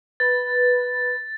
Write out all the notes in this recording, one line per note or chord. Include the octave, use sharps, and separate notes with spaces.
B4 A6